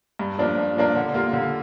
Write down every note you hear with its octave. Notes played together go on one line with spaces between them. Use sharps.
G2
F3 A#3 D4
G2
F3 A#3 D4
D3
G3 A#3 F4
D3